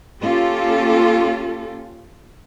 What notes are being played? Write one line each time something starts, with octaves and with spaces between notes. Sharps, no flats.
A#3 C#4 F4 G4 A4